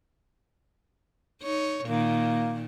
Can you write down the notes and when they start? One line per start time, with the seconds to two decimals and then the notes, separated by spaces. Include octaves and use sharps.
1.42 D#4 C#5
1.85 A#2 D#3 A#3